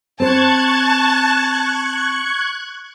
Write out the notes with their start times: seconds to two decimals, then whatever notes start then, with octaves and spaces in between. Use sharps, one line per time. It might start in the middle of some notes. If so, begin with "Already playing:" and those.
0.20 C4 C5 A5 C#6 F#6 G#6